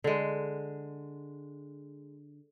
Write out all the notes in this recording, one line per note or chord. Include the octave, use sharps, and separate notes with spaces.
D3 G#3